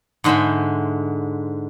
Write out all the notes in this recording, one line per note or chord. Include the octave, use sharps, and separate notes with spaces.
G#2 D3 G#3 C5 E5 B5